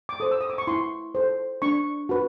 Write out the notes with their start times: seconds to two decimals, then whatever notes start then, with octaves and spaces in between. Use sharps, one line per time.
0.09 D6
0.20 A4 C5 D#6
0.32 E6
0.41 D#6
0.50 D6
0.58 C#6
0.67 E4 C6
1.15 A4 C5
1.62 D4 C#6
2.09 F#4 B4